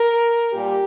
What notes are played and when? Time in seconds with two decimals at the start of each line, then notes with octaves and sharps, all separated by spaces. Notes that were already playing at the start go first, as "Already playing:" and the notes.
Already playing: A#4
0.52 A#2 G3 G4